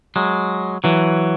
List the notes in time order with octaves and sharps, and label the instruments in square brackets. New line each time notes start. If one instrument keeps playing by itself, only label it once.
[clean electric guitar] F#3 G#3
E3 F#3